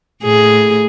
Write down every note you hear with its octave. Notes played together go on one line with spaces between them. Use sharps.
A2 G#4